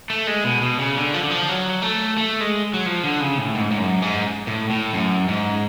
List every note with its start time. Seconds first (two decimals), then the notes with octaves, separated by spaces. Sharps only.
0.10 A3
0.27 G#3
0.44 B2
0.62 B2
0.79 C#3
0.97 D3
1.14 F3
1.23 D3
1.31 F3
1.48 F#3
1.82 A3
2.17 A3
2.40 G#3
2.74 F#3
2.86 F3
3.04 D3
3.21 C#3
3.38 A2
3.55 G#2
3.71 G#2
3.78 F#2
4.02 G#2
4.47 A2
4.70 A2
4.93 F#2
5.28 G#2